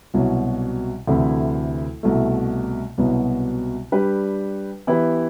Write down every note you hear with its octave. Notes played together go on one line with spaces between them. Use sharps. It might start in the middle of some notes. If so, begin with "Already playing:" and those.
C2 B2 F#3
D2 C3 E3 A3 E4
C2 B2 A3
C2 B2 F#3 B3
G3 D4 G4 B4
E3 B3 E4 G4 B4